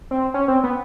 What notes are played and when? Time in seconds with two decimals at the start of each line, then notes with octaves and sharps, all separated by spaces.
0.11 C4
0.34 C#4
0.48 C4
0.64 B3